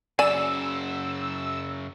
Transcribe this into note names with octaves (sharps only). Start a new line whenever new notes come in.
F#2 C#3 D5 G#5 E6